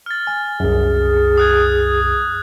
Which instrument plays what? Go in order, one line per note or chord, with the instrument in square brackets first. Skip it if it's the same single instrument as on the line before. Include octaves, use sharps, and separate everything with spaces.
[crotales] F6 A6
[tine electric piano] G#5
[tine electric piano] C2 F#2 [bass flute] G#4
[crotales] D#6 F#6 G#6